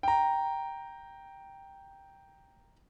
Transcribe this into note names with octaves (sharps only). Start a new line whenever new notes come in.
G5 A#5